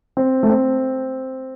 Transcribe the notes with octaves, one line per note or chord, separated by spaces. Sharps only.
C4
A3
C4